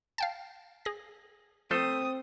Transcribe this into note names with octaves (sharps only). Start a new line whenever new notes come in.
F5 G5 A5
G#4 A#6
F3 A3 C4 A4 C5 D#6